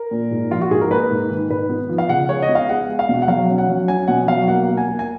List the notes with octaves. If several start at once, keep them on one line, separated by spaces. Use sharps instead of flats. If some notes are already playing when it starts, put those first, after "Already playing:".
Already playing: A#4
A#2
G#2
F3 F4
F#4
G#2 G#4
A#4
A#3 B4
G#2
D#3
G#2 B4
B3
F3
F5
C#3 F#5
G#3 C#5
D#5
B3
F5
G#3 F#5
G#3
F5
B2
F#5
F#3 F5
C#4
F#5
F#3
C#4 G#5
B2 F#5
F#3 F5
A#3 F#5
A#3
G#5
A#3
G#5